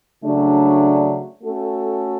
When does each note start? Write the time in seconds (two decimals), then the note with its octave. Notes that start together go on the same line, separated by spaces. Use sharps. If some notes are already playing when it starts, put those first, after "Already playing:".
0.23 C#3 F#3 A3 D4
1.42 A3 C#4 F#4 A4